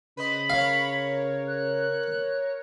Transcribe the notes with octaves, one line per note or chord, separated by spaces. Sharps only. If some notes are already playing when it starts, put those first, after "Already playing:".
C#3 B4 C5 D#5 B5
A#4 C#5 F5
F#6